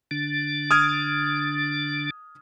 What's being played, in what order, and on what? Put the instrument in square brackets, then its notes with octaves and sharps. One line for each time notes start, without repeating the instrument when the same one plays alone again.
[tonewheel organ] D3 D4
[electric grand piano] D#6 F6 G#6